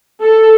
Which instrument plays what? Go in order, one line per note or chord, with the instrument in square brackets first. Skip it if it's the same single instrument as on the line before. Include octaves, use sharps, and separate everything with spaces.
[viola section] A4